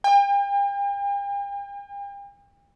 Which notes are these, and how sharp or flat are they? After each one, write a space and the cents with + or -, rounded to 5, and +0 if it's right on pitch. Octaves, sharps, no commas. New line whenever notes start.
G5 +40